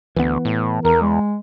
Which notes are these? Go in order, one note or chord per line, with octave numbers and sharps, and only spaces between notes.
D2 E3 B3
A2
E2 A#4
G#3